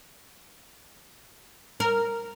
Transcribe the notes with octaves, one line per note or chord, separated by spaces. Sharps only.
A#4